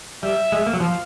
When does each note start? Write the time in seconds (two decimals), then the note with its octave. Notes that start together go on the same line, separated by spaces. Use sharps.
0.22 G3 E5
0.52 G#3
0.66 A#3
0.73 F#3
0.80 F3 F5